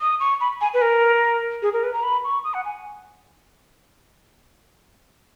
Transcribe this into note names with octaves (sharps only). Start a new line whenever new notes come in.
D#6
C#6
B5
G#5
B4
A#4
G#4
A#4
B4
A#5
B5
C#6
D#6
F#5
G#5